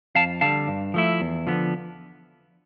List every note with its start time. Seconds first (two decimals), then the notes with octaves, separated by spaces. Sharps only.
0.15 F2 F5 A5
0.41 D3 G3 F5 A5
0.68 G2
0.94 F3 A3 E4
1.21 E2
1.47 D3 F3 B3